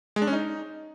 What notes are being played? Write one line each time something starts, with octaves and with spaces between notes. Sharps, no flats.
G#3
D4
C#4
D#4